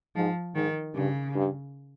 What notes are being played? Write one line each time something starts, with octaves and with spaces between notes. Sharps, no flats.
G#2 F3
G#2 D#3
G2 C#3
G2